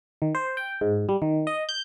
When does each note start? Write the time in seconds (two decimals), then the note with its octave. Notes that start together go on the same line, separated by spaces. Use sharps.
0.22 D#3
0.35 C5
0.57 G5
0.81 G#2
1.09 G3
1.22 D#3
1.47 D#5
1.69 G6